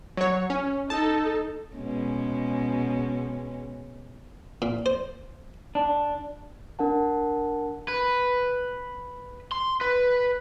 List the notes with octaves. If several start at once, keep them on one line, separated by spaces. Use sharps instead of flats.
F#3 C#5
C#4
D#4 A4 A5
B2 G#3 C#4
A#2
C5
D4
D4 A#4 F#5 A5
B4
C6
B4